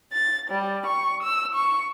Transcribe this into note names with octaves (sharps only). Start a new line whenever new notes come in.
A6
G3
C#6
E6
C#6